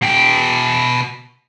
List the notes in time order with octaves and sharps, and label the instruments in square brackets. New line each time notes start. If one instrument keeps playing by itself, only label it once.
[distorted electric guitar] B2 G5